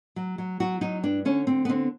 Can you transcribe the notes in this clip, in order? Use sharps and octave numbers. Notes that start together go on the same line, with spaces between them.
F#3
F#3
F#3 F#4
F#3 D#4
G2 D4
D3 C#4
D3 C4
B3
D3 C4